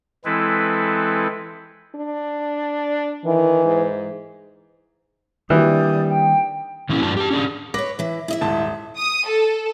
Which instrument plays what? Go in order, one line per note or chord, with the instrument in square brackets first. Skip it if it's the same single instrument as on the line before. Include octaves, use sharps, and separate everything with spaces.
[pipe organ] E3 G#3 C4 E4 A4 B4
[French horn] D4
[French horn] D#3 [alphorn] E3
[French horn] G#2
[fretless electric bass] D#3 A#3 D4 [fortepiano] E3 [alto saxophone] G3 [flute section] D5 D#6 G6
[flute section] G5
[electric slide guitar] A#2 E3 A#3 C4 C#4 E4
G2 F3 D4 F#4 A5
G4 A5
C#4 D4 G#4
[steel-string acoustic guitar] B4 C#5 [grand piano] D6 A#6
[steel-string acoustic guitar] E3 E4
E4 D#5 E5
[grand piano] D#1 G#2 A5
[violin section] D#6
A4